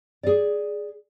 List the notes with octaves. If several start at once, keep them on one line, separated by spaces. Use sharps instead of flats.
G#4 D5